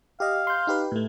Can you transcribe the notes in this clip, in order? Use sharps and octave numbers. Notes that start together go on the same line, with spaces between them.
G4 D#5 F5
C6 G6
D#4 G4 B4
A2 A3